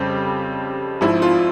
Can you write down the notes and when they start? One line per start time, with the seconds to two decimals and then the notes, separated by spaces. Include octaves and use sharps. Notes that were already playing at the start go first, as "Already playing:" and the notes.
Already playing: F2 C#3 G3 C4 G4
1.01 G#1 G#2 F3 C4 E4
1.22 F4